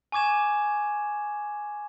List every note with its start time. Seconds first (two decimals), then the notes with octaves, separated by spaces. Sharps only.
0.12 G#5 C#6 D6 G#6 E7